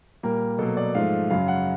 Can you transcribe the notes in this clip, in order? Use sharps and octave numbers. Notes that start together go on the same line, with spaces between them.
A#2 G3 A#3 A#4
B2 F#3 A#3 A4
D5
G#2 F3 A3 F5
F#2 C#3 F#3 F5
F#5